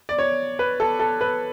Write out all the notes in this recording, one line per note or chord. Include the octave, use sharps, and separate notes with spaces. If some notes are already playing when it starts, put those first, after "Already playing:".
D5
C#5
B4
A4
A4
B4